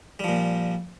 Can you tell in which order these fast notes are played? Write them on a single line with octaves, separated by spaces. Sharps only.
G3 F3 A#2